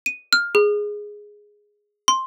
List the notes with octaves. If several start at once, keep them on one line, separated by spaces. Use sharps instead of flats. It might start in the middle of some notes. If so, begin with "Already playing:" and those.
D#7
F6
G#4
C6